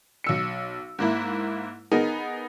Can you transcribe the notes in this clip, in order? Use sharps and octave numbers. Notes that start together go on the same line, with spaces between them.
B1 E6 C#7
G#2 A#3 E4
B3 D#4 G#4 A#4